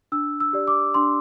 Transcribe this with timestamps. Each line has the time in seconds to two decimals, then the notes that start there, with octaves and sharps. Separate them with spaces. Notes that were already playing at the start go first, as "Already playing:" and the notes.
0.12 D4 E6
0.40 E6
0.53 G4 D5
0.67 D6
0.94 D4 C6